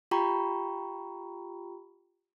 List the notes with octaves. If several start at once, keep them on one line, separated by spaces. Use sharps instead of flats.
F4 G4 G5 A#5 B5 C#6